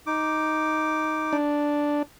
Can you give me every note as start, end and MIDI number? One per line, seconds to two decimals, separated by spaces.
0.07 1.37 63
0.07 1.37 86
1.33 2.03 62